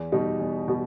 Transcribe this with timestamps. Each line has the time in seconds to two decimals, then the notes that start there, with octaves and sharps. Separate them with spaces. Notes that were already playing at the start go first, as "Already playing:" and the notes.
Already playing: E2
0.12 B2 G3 D#4
0.40 E2
0.68 B2 G3